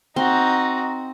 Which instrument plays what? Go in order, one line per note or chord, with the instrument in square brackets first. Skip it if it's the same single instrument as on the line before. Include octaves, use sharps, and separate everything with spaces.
[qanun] C4 [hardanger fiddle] D#4 F#4